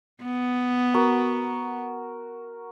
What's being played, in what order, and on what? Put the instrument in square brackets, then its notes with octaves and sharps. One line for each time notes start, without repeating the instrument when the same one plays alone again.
[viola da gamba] B3
[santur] F#4 A#4